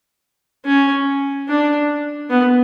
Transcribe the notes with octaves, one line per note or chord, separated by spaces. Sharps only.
C#4
D4
B3